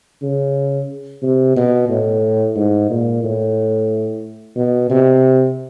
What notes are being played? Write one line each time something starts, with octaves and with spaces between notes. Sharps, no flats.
C#3
C3
B2
A2
G#2
A#2
A2
B2
C3